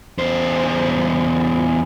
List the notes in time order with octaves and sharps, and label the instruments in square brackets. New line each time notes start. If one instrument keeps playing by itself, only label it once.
[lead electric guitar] E2 C5